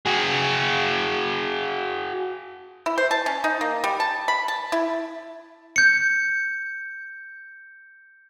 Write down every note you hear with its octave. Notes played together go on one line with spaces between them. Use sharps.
F#4 G#4
E4
C5
A5
C#4
D#4
A#3
G3
A5
B5
A5
E4
G6 C#7